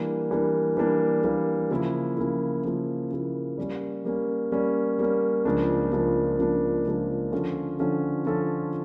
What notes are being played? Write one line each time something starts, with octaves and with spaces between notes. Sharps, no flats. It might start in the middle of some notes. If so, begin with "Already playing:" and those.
Already playing: E3 G3 A#3 D4
E3 G3 A#3 D4
E3 G3 A#3 D4
E3 G3 A#3 D4
C#3 F3 A#3 E4
C#3 F3 A#3 E4
C#3 F3 A#3 E4
C#3 F3 A#3 E4
G3 A#3 C#4
G3 A#3 C#4
G3 A#3 C#4
G3 A#3 C#4
C#2 C#3 F3 A#3 D4
C#2 C#3 F3 A#3 D4
C#2 C#3 F3 A#3 D4
C#2 C#3 F3 A#3 D4
D3 F3 C#4 F4 A4
D3 F3 C#4 F4 A4
D3 F3 C#4 F4 A4